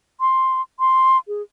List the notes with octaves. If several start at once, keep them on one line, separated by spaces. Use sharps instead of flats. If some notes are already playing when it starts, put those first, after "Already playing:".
C6
C6
G#4